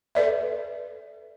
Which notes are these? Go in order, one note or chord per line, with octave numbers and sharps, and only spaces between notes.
A4 B4 D5 E5